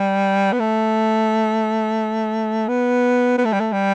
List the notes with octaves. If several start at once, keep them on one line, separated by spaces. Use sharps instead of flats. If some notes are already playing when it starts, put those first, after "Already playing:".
Already playing: G3
B3
A3
B3
B3
A3
G3
A3
G3